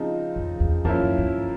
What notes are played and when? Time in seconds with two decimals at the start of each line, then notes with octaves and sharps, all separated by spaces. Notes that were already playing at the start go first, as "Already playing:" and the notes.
Already playing: C#3 F3 G#3 C4 D#4
0.36 F2
0.60 E2
0.85 F2 F3 A#3 C#4 E4
1.01 F#2
1.18 G2